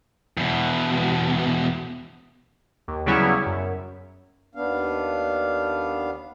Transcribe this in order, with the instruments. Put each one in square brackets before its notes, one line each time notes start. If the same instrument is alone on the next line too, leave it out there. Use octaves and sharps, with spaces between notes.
[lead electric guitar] E2 B2
[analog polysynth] D#2
C#3 F#3 G3 B3 C#4 E4
F#2
[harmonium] D#2 B3 D4 F5